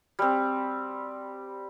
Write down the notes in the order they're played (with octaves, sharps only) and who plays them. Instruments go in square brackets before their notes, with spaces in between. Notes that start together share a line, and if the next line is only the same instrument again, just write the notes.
[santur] G3 C4